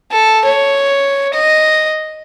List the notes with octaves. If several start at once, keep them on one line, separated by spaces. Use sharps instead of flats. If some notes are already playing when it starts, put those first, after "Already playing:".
A4
C#5
D#5